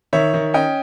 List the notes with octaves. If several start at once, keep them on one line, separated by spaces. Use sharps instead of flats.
D#3 C#5 E5
D#3
C#4 D#5 G5